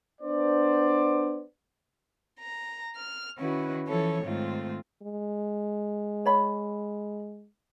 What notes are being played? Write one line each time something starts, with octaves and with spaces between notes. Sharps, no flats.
B3 D4 C5 D5
A#5
F6
D#3 C#4 E4 F#4 B4
E3 F3 C#4 E4 A4 C#5
G#2 D#3 A3 C4 F4
G#3
C#5 B5